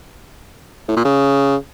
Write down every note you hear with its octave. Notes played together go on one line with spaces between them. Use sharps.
A2
A#2
C#3